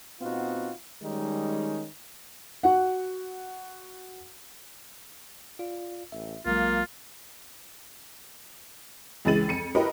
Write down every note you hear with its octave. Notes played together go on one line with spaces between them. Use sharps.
A#2 B3 C4 D#4 F4 F#4
D#3 G3 G#3 C#4 D#4
F#4 F#5
F4 D5 F5
A1 E5
B1 F#3 G#3 A#3 F4
C#2 E3 G#3 A6 D#7 F#7
F2 C#7 D#7
E4 F#4 G4 A#4 B4 D#5